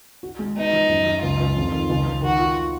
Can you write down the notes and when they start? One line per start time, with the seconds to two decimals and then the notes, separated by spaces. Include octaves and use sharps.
0.23 F#4
0.39 G#3
0.57 B3 D#4
0.73 F3
0.89 F#2
1.06 F#2
1.22 C#2 F4
1.40 C#2
1.57 F2
1.72 D#3
1.89 C#2
2.06 C#2
2.22 D#3 F#4
2.39 F4